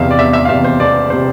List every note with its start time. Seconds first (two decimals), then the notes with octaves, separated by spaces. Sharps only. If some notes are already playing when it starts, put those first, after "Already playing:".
Already playing: E1 E2 C3 E5 F5
0.11 D5
0.18 E1 E5
0.33 E5
0.45 F5
0.49 E2 C3 E5
0.64 C5
0.80 E1 D5
1.10 C5
1.13 C3